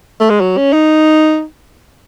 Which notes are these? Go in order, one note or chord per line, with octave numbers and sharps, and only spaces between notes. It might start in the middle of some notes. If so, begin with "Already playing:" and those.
A3
G#3
F#3
C#4
D#4